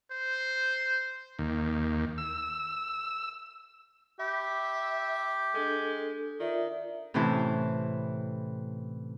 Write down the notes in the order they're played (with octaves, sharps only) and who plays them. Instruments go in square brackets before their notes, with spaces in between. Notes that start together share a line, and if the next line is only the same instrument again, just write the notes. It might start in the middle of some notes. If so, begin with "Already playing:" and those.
[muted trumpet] C5
[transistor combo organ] D#2
E6
[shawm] G4 [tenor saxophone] E5 [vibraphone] B5
[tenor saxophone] G#3 [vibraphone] D4 A4
[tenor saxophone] D#3 [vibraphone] F4 D5 E5
[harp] A2 C3 E3 C#4 C5 A5